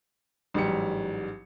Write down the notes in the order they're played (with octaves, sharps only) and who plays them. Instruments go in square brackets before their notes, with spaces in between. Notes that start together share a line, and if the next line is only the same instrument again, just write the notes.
[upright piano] A1 G#2 F#3 G3 G5 C#7